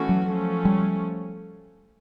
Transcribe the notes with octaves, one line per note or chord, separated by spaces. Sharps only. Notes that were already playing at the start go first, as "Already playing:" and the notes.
Already playing: E3 A3 C#4 F#4
F#3
F3 A3 C#4
G3